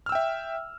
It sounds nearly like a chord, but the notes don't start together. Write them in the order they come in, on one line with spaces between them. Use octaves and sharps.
F6 E6 G5 E5